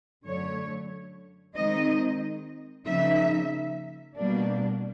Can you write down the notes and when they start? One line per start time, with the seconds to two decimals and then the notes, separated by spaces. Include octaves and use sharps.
0.24 F#2 D3 F#3 A3 C#5
1.55 D#3 G#3 C4 D#4 D#5
2.86 C#3 F3 A#3 D#4 E5
4.16 B2 G3 A#3 D4